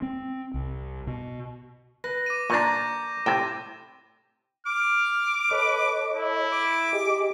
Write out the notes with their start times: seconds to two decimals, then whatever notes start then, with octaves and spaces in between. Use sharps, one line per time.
0.02 C4
0.54 C2
1.07 B2
2.04 B4 A#6
2.26 D6 D#7
2.50 A#2 D4 A#5 C#6 G6 A#6 D#7
3.26 A2 C3 G5 E7
4.67 D6 F6
5.51 A4 B4 C#5 D#5
6.16 E4
6.52 D6
6.93 G4 G#4 D#5